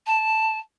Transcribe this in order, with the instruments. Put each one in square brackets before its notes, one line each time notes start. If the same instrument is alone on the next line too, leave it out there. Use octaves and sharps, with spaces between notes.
[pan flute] A5